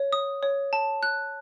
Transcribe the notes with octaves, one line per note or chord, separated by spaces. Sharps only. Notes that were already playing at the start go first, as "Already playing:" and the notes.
Already playing: C#5
D#6
C#5
A5
F#6